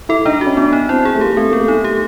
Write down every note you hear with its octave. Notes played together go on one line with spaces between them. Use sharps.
E4 A4
D4 D#4
F#4
C#4
B3 D4
D#4
C4 E4
G#4
A3
A#3 G4
A3 C4
A#3 B3
A3
D#4
G4